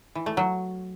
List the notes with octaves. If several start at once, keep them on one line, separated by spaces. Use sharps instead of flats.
E3
A3
F#3